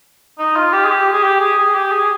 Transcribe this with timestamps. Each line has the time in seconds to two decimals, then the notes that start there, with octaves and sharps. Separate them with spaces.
0.39 D#4
0.56 F4
0.73 G4
0.85 G#4
0.91 G4
1.13 G#4
1.24 G4
1.41 G#4
1.59 G#4
1.75 G4
1.92 G#4